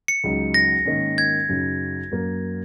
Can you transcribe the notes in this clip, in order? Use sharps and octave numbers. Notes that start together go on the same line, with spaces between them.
C#7
C#2 C#3 F#3 D#4
A#6
G#2 D#3 A#3 C#4
G#6
F#2 C#3 F#3 D#4
F#2 F#3 A#3